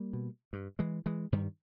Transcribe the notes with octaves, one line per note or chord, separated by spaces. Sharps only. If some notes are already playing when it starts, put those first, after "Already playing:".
Already playing: G3 A#3
B2
G2
E3 G#3
E3 G#3
G2 D#3 G3